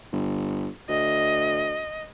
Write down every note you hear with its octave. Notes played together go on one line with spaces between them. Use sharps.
G1
D2 D#5